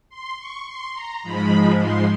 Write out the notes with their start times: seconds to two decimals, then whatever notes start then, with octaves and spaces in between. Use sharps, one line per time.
0.10 C6
0.38 C#6
0.66 C6
0.94 A#5
1.23 G#2 F3 G#3 B5
1.80 C6